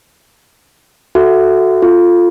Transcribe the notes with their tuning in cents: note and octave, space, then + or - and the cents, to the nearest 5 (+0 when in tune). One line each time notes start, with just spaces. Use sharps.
F#4 +0 A4 +0 E5 +15
F4 +0 A4 +0